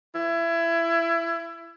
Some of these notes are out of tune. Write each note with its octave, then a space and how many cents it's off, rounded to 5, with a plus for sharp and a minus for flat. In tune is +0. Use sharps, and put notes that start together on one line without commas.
E4 +25